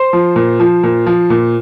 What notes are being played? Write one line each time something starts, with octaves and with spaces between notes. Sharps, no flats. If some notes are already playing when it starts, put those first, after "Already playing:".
Already playing: C5
F3
A#2
F3
A#2
F3
A#2